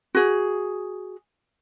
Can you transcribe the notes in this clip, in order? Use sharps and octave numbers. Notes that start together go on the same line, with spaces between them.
F#4 G#4